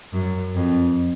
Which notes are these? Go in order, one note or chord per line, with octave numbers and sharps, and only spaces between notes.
F#2
F2